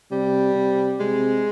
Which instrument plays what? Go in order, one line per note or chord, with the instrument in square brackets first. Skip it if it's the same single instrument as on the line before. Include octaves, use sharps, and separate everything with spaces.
[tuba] C3 [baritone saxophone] G3
[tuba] C3
[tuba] C3 [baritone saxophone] G#3